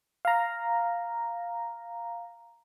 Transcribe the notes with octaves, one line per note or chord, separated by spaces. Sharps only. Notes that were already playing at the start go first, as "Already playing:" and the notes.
F5 A#5